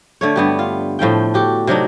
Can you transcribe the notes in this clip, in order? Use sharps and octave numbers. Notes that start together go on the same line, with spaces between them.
D3 A3 C#5
G2 B3 G4
F4
A2 F3 A3 G5
F#4 G4 A4
C3 F#3 D4 D#4